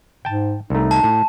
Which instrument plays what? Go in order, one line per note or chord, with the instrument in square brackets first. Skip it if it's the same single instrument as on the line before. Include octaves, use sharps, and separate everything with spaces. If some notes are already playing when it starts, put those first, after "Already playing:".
[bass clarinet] G#2 [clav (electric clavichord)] G5 A5
[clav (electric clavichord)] C2 A3 [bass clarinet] D#4
[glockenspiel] A5
[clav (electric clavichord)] A2